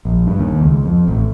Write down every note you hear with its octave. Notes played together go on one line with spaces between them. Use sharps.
A#1
G2
D#2
C#2
F2
A1